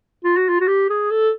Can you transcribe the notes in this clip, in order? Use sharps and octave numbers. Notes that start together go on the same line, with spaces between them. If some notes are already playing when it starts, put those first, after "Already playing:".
F4
F#4
F4
F#4
G4
G#4
A4